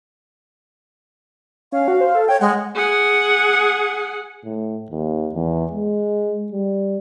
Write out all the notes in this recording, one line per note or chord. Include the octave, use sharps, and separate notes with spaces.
C#4 F5
F#4
C5
A4
C#5 G5
G#3 F#5
G#4 F#5
A2
D#2
E2
G#3
G3